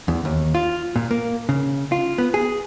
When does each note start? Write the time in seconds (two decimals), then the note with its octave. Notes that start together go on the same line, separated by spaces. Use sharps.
0.08 E2
0.25 D#2
0.55 F4
0.96 A#2
1.11 A#3
1.49 C#3
1.92 F4
2.18 B3
2.34 G#4